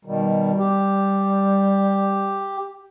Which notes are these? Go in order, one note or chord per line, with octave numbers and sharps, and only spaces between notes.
B2 D#3 G3
G4